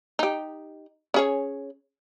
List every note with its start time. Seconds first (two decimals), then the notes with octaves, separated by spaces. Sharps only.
0.19 D#4 G4
1.14 C#4 G#4 C#5